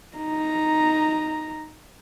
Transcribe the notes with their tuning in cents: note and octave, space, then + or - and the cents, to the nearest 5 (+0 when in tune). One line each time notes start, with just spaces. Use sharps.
D#4 +0 A#5 +0